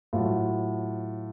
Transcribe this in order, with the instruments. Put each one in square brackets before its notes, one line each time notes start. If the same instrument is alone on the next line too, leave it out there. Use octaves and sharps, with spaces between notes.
[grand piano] A2 F#3 F4